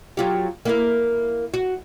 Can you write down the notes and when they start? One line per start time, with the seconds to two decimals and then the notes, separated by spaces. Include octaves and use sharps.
0.17 F#3 F4 G4
0.65 A#3 E4 A#4
1.54 F#4